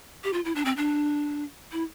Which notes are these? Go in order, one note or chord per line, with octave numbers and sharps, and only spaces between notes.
G4
F4
E4
D4
C4
D4
E4